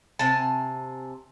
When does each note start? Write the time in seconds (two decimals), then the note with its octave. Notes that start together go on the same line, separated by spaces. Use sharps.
0.19 C3 G#5 A5